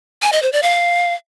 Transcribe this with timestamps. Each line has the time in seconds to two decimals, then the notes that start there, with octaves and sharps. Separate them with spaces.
0.22 G#5
0.32 D#5
0.42 C5
0.53 D5
0.63 F5